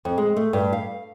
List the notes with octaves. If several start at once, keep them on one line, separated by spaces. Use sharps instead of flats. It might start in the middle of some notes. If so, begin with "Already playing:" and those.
F2
G#3
A3
G2
F5